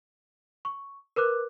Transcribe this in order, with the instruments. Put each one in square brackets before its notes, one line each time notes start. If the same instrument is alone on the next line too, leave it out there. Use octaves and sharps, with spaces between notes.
[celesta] C#6
A#4 B4 D6 F#6